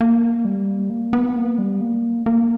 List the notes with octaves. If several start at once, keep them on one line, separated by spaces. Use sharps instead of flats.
A#3
G3
A#3
B3
A#3
G3
A#3
A#3